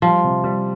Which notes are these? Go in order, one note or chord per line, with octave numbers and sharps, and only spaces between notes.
F3 G3
C3
G3